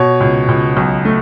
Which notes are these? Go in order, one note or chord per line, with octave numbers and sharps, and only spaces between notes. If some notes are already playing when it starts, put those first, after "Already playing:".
Already playing: B2 C#5
C#2
C#2
B1
A3